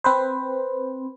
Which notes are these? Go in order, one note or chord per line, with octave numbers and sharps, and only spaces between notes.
C4 B4 C5